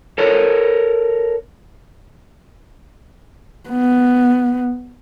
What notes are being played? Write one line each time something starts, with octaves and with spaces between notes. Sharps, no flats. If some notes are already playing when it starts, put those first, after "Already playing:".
A4 A#4 C#5
B3